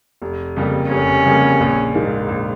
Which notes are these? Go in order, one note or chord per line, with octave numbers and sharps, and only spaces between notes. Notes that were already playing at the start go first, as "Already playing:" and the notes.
F1
F2 C#3 G3 A#3
F1 C#4
F2 C#3 G3 A#3
A#1
G#2 D#3 A#3
A#1